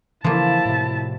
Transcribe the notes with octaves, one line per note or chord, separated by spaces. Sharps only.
C#3 E3 F3 A#3 E4 A5
A2 C3